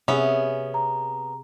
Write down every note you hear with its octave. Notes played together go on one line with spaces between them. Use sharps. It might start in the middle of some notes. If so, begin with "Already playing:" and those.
C3 B3 C#4 G#4 E5
A#5